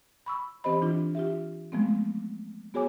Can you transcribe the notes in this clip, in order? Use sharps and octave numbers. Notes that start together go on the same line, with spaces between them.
B5 C#6 E6
E3 C4 G4 C5 D#5 B5
E3 D4 F4
F4 G4 E5
F3 G#3 A3 B3 C4
B3 F#4 G#4 C#5 G#5 D6